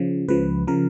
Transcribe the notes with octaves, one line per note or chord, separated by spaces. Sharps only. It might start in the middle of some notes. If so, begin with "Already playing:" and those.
Already playing: C#3 F3
C#2 C#3 F3 B4
C#3 F3 A#4